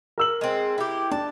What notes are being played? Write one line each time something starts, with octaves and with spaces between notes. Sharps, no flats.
A#4 E6 F#7
G#3 C4
E4 G4
D4 A5